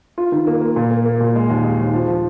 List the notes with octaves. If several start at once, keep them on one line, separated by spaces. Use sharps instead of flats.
F4
D#3
A#3
A#3
A#2
A#3
A#3
A#2
G#3
D#2
G#3
D#2
F3
F3